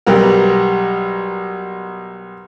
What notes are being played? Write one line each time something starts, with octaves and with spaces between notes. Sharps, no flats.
B1 G3 B3 A#4